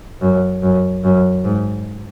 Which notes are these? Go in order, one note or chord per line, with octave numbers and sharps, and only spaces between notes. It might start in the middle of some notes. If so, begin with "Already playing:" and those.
F#2
F#2
F#2
G#2